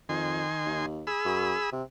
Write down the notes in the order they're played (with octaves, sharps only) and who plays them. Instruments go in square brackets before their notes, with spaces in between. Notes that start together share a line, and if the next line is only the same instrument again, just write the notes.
[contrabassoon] F2 [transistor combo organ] D#3 G#5 C6
[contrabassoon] D#2
[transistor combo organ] G#4 B5 E6
[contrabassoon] F#2
C3